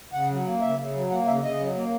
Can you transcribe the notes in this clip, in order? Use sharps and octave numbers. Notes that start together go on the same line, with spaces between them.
C#3 F#5
F#3
A#3
C#3 E5
C#3
F#3
A#3 F#5
C#3 E5
C#3 D#5
F#3
A#3